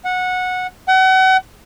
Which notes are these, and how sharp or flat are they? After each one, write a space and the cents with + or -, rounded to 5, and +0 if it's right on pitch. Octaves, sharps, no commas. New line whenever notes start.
F#5 -15
F#5 +35